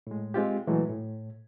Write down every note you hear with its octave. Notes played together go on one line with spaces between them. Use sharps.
A2 G#3
G#3 C4 F4 G4
A#2 E3 F#3 G#3 A3
A2